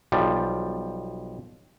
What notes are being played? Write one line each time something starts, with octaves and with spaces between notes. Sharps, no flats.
B1 F3 G3